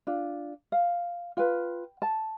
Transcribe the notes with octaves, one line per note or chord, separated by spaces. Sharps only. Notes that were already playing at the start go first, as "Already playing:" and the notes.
D4 F4
F5
F4 B4 G5
A5